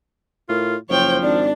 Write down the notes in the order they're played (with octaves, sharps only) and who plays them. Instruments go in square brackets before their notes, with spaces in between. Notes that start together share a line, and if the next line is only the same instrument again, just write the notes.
[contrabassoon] A2 [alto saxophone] F4 [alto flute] A#4
[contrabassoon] F#1 [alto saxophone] F3 [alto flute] C5 [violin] C#5 G5
[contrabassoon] G#1 [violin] D4 [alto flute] D5